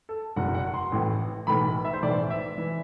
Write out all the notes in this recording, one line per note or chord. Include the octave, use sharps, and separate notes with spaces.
A4
F#1 E2 B2 F#5
F#5
C6
A1 A2 E3
B1 A2 E3 B5
E5
C5
B1 A2 E3 D5
E5
E3